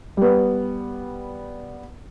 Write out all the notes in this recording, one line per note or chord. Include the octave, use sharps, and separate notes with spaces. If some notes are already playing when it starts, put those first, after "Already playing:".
G3 B3